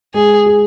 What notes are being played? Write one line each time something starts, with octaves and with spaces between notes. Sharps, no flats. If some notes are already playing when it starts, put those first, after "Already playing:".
G#3 G#4
G#4